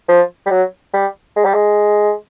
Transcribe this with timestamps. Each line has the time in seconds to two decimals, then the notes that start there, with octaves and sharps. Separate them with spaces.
0.09 F3
0.46 G3
0.51 F#3
0.94 G3
1.36 G#3
1.45 G3
1.54 G#3